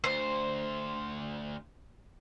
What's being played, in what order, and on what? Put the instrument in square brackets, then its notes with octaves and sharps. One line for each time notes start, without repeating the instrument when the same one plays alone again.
[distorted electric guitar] D2 [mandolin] C5